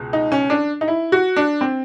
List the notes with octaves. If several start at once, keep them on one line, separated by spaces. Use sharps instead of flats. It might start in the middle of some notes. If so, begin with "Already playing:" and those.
Already playing: C#2 B2
D#4
C#4
D4
D#4
E4
F#4
D4
C4